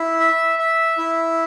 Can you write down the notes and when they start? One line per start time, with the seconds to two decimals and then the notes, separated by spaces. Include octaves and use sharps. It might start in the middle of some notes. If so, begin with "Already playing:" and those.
Already playing: E4
0.20 E5
0.59 E5
0.98 E4